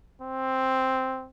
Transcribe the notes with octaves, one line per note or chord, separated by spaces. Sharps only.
C4